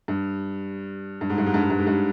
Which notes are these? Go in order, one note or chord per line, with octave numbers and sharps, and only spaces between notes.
G2
G2
G#2
G2
G#2
G2
G#2
G2
G#2
G2